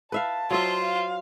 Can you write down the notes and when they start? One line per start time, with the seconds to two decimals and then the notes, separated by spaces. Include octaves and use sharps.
0.12 B4 E5 F5 A5
0.51 F#3 F4 C5 D#5 E5
0.83 F5